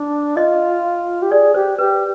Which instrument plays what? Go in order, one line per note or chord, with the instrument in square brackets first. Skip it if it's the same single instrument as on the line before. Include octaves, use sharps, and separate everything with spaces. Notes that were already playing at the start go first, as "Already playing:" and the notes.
Already playing: [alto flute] D4
[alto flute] F4 [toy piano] D#5
[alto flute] G4
[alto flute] G#4 [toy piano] D5
[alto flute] G4 [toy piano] C5
[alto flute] G4 [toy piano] B4